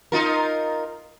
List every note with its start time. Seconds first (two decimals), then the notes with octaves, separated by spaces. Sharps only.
0.12 D#4 F4 A#4